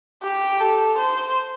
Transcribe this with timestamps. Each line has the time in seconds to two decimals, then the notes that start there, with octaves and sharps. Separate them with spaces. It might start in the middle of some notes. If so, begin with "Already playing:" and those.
0.23 G4
0.60 A4
0.98 C5